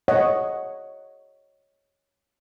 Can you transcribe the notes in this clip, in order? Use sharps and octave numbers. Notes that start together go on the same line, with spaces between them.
C#5 D#5 F#5